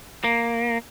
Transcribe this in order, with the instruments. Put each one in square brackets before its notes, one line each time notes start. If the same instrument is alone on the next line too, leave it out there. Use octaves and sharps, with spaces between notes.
[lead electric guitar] A#3